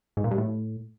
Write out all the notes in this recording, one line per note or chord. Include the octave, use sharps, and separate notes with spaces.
G#2
A#2
G2
A2